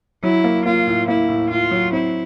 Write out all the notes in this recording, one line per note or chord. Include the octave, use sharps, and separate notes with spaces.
F#3 E4
A#3
A#3 F4
A2
A#3 E4
A2
A2 F4
F#3
C4 E4